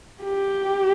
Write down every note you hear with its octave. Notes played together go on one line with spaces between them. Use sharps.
G4